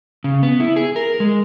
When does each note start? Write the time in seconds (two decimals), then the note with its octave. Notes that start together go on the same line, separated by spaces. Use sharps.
0.24 C#3
0.43 B3
0.60 E4
0.76 G#4
0.96 A#4
1.20 G#3